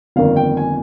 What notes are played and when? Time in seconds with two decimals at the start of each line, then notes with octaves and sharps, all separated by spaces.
0.16 G1 F2 D#3 A#3 F5
0.36 G5
0.57 G#5